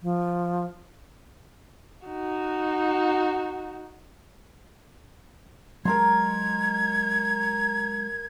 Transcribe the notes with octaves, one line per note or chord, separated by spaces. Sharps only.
F3
D#4 F#4
F#3 G#3 A#4 A#5 C6 G#6